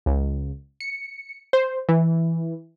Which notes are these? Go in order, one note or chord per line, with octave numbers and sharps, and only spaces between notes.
C#2
C#7
C5
E3